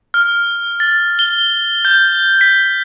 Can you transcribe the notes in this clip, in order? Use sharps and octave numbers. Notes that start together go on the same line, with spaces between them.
F6
A6
G7
G6
B6